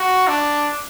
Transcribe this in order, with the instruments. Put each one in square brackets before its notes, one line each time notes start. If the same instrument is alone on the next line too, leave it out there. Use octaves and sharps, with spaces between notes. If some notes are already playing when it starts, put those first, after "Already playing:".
Already playing: [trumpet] F#4
D4